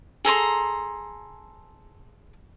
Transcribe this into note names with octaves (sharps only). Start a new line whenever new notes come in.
G#4 A4 A#5 C6